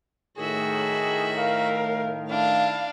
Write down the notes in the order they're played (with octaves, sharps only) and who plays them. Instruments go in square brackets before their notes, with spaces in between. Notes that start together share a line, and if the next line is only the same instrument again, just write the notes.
[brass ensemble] A2 D#3 [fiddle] F#4 E5 [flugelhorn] G#4
[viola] A#4 [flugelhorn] F5
[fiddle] D4 [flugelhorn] E4 [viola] F5